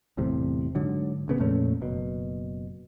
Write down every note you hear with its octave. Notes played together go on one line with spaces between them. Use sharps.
G1 E2 A2 C3
G#2 D3 F#3
A1 C#3 B3
F2 A#2 A3 C#4
F#1 B2